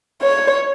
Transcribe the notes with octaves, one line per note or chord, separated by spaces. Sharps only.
C#5